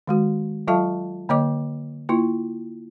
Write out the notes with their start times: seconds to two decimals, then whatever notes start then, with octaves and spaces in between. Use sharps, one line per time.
0.08 D#3 G#3 F#4
0.68 F#3 F4 A4 E5 F5 A5
1.29 D3 A#3 C#5 D#5 D6
2.09 A#3 E4 F4